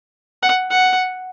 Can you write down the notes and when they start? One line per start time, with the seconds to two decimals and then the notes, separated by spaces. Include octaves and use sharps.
0.43 F#5
0.70 F#5